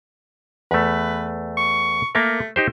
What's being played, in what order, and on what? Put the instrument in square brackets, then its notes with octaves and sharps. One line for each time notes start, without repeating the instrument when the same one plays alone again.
[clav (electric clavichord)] E2 A3 [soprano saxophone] B4
[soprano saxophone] C#6
[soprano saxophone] A3 [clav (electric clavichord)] A#3 A#4
[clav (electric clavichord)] D#4 G4 C5